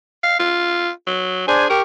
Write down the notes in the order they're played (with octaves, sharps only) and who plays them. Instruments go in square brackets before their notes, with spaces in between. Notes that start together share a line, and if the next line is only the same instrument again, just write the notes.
[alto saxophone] F5
F4
F#3
[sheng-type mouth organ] D4 C5 G#5 [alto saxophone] G#4
[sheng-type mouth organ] G4 C#6 [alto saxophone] A#4